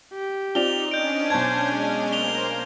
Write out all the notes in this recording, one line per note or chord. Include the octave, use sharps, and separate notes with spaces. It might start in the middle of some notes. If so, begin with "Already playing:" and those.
G4
C4 D#4 F4 D5 F7 G7
C#4 D4 D#5 G#5 G6 D7
B1 C5 A5 G#6
G#3
A#3 A#4 C5 F7 G7